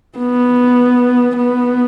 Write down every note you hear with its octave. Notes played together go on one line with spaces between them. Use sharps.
B3
B3